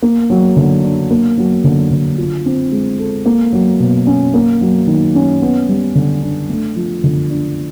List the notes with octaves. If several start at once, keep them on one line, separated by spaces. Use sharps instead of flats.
A#3
F#3
D3
D4
A#3
F#3
D3
D3
F4
C4
G#3
A4
A#3
F#3
B2
C#4
A#3
F#3
D#3
C#4
B3
G3
D3
D4
A3
F3
D3
D4